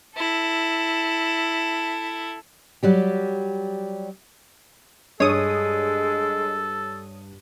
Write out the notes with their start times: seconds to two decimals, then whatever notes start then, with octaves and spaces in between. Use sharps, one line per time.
0.15 E4 A4
2.83 F#3 G3 G4
5.20 G2 G#3 A4 C#5 D#6